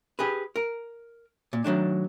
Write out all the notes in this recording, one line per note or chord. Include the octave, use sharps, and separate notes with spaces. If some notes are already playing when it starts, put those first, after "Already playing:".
G4 G#4 B4
A#4
A#2
D#3 F#3 A3 D4